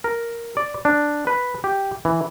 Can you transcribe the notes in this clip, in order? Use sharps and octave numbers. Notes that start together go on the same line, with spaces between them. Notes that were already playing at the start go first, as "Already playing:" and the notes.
A#4
D5
D4
B4
G4
E3